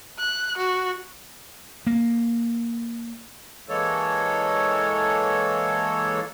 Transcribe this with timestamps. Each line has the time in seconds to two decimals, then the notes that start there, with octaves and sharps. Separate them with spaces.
0.19 F#6
0.58 F#4
1.87 A#3
3.69 E3 G#3 A#3 A4 C#5